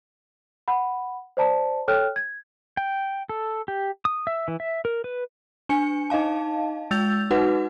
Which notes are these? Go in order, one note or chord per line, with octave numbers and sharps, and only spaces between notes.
F#5 B5
C5 D5 A5 A#5
A4 C#5 G5 F6 F#6
G#6
G5
A4
G4
D#6
E5
E3
E5
A#4
B4
D4 G#5 C#7
D#4 D#5 F5 A5
G#3 E6 G6 A6 F7
D#4 F#4 B4 F#5